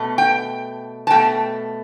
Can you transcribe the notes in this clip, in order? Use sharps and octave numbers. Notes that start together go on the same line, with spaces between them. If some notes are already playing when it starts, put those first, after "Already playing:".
Already playing: B2 A3
G5
A5
B2 A3 G5